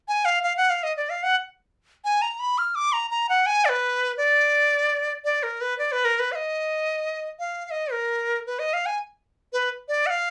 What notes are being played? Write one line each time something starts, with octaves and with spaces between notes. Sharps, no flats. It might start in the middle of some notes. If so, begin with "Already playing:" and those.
G#5
F5
F5
F#5
F5
D#5
D5
F5
F#5
G#5
A#5
B5
F6
D6
A#5
A#5
F#5
G#5
D5
B4
D5
D5
A#4
B4
D5
B4
A#4
B4
F5
D#5
F5
F5
D#5
A#4
B4
D#5
F5
G#5
B4
D5
F#5
F5